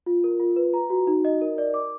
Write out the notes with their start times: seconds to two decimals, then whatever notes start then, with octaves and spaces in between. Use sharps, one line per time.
0.06 F4
0.24 A#4
0.40 F4
0.56 B4
0.74 A#5
0.90 F#4
1.07 D#4
1.25 D#5
1.41 A#4
1.58 D5
1.74 D6